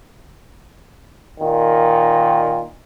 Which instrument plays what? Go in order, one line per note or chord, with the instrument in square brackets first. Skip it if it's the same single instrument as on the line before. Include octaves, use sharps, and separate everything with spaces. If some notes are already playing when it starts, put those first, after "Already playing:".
[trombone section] A#2 D#3